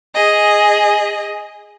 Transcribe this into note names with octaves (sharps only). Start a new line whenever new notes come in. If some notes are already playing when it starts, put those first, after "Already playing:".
G#4 D#5